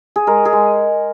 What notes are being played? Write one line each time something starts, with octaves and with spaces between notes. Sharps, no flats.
G#4
G#3 A#4
G#4
G#3